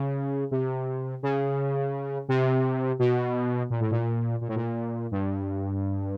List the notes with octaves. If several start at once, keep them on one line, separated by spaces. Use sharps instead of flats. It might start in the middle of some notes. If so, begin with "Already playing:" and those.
Already playing: C#3
C3
C#3
C3
B2
A#2
A2
A#2
A#2
A2
A#2
G2